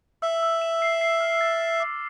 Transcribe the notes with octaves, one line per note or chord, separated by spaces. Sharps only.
E5 E6
E6
E7
C7
C7
F6
A6
A6
D6